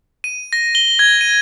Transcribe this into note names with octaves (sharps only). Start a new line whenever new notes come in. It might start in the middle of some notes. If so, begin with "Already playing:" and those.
D#7
A#6
G7
G#6
D#7